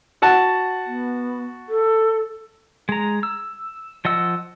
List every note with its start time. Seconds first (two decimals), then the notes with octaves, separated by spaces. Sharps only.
0.22 F#4 F#5 A5
0.87 B3
1.69 A4
2.89 G#3 A#5
3.23 E6
4.05 F3 D#5 F#5 E6